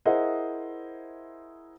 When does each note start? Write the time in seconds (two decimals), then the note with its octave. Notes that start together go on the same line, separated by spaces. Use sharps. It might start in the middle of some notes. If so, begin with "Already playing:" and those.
0.05 E4 G#4 A#4 C5 D#5 F#5